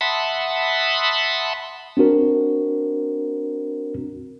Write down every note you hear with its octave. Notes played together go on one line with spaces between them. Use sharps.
E5 F#5 A5 B5 C6 D#6
C4 D4 F#4 A#4